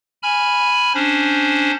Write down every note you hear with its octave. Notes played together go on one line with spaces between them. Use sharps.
G#5 B5 F6
C#4 D4 C5